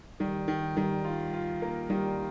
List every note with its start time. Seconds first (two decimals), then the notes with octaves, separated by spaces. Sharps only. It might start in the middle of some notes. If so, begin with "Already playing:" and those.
0.20 D#3 G3
0.48 D#3
0.77 D#3 G3
1.05 F4
1.33 F4
1.62 A#3
1.90 D#3 G3